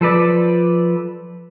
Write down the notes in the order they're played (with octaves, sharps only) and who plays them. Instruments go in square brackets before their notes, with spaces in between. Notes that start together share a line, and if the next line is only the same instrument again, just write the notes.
[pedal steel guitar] F3 A4 B4 D5